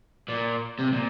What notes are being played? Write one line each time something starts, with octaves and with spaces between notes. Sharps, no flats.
A#2
C3
A#2